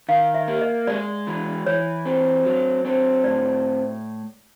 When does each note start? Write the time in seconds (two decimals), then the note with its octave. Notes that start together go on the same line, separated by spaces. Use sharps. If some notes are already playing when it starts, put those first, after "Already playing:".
0.09 D#3 F5
0.34 E5
0.48 A#3
0.61 D#5
0.87 G#3 D5
1.27 E3
1.66 E3 C#5
2.06 C4
2.45 F#3
2.85 C4
3.24 A2 D5